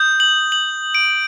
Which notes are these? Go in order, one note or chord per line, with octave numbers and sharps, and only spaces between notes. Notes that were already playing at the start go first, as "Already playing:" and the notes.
Already playing: D#6 G6
F#7
F#7
D7